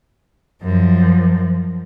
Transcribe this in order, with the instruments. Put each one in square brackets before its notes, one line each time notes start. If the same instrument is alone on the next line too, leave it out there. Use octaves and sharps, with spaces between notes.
[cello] F#2 [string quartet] F3